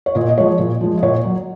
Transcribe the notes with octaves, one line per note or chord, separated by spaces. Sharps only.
C#5
A#2 D#5
D#5
F3 G#3 C#5
A#2
F3 G#3
D#5
A#2 C#5
F#3